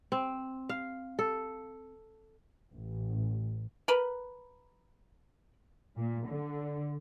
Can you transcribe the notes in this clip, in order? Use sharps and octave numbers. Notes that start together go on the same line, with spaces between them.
C4
F5
A4
A1
A#4 B4
A#2
D3